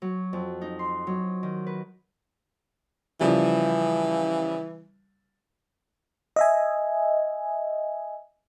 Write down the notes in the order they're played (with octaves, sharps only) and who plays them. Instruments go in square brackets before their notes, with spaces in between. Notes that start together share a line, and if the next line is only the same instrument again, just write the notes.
[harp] F#3
F2
D#4
C6
F#3
D#3
B4
[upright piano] C#3 F3 G3 [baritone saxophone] E3
[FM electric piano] D#5 E5 G#5